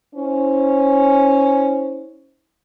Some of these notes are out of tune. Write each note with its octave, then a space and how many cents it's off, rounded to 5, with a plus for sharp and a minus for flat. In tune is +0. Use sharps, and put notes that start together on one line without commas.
C#4 +0 E4 -40 C5 +0